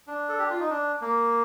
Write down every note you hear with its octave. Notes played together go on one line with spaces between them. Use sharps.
D4
A4
G4
F4
D#4
D4
A#3